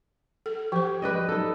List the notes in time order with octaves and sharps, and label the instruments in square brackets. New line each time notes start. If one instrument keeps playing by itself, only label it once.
[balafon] A4
[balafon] F3 C5 [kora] G4
[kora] B4 D5 D#5
D#4 A4